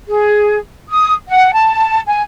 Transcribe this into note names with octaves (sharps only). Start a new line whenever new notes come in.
G#4
D#6
F#5
A5
G#5